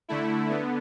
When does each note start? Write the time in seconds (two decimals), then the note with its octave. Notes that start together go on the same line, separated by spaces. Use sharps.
0.08 D3 A3 E4
0.50 D3 B3